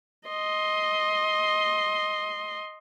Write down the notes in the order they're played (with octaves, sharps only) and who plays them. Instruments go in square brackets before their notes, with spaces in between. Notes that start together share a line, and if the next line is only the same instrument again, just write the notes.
[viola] D#5 C6